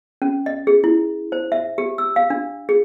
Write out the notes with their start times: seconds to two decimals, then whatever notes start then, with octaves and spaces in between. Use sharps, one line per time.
0.22 C#4
0.46 D#5
0.67 G#4
0.84 E4
1.32 C5
1.52 E5
1.78 G4
1.98 E6
2.16 F5
2.30 D4
2.69 G#4